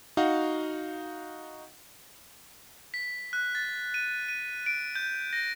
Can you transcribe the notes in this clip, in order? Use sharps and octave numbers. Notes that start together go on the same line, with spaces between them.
D#4 F#4 F5 F#5
B6
F#6
A6
D#7
D#7
D7
G6
A#6